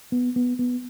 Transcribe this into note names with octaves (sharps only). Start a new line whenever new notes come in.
B3
B3
B3